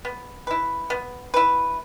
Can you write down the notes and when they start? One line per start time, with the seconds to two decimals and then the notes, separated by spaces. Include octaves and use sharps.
0.05 B3
0.47 E4 B4
0.90 B3
1.34 E4 B4